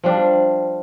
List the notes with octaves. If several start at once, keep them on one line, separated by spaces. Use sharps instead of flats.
F3 G3 D4